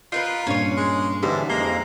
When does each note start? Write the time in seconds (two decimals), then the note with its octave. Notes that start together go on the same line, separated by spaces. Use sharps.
0.12 D#4 F4 A#4 B4
0.47 G2 A#2 C#4 C#5
0.77 G#3
1.23 G#2 D3 E3 G3 G#3 C#4 D#4 G4
1.50 F2 G#3 A#3 A#5 G7